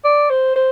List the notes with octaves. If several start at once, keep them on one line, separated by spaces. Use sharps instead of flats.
D5
C5
C5